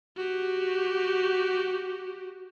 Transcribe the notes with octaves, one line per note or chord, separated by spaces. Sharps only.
F#4 G4